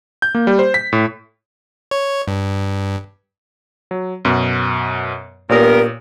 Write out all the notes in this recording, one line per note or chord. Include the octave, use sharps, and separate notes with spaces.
G6
A#3
G3
C5
B6
A2
C#5
G2
F#3
F#2 B2
G2 A#2 B3 A#4 C#5 D#6